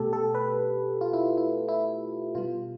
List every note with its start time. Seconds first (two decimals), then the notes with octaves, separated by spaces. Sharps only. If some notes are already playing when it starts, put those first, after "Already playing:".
Already playing: B2 A3 G4 A4
0.13 A4
0.35 B4
1.01 F4
1.13 E4
1.38 E4
1.68 E4
2.35 B2 G3 F4